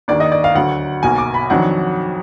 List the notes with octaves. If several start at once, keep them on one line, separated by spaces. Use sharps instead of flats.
D#2 D#3 A#3 D4 D5
D#5
D5
F5
D2 D3 F#3 F#5
B1 B2 A#3 G#5
D6
B5
F2 D#3 F#3 D4 F#5